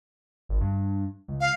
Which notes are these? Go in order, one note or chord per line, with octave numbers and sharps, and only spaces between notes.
G#1
G2
C#2
F5